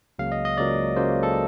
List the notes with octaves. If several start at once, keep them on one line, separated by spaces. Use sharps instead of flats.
C#2 C#3 F#3 A#3 F5
D#5
D#5
C#2 C#3 F#3 A#3 D5
C#2 C#3 F#3 A#3 C5
A4